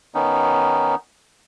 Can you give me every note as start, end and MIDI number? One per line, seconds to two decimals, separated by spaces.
0.15 0.95 51
0.15 0.95 59
0.15 0.95 61
0.15 0.95 63